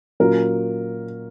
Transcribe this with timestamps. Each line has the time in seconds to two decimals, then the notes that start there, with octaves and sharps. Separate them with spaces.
0.20 A#2 F#3 C#4 F4 A#4